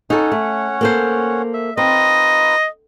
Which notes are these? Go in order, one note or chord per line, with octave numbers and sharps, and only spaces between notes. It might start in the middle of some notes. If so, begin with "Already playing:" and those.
C#4 D#4 A4 C#5 F#5
A3
A#3 A4 C5
E5
C4 D#4 F4 B4 D#5